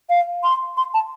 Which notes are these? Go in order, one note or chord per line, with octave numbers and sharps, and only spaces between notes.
F5
C6
C6
A5